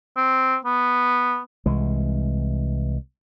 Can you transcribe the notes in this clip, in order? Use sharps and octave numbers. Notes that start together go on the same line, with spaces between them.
C4
B3
C2 E3 G#3